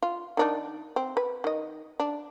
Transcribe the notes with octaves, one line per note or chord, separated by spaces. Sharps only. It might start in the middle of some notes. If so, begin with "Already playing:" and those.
F4
D#3 D4 D#4
C4
B4
D#3 D#5
D4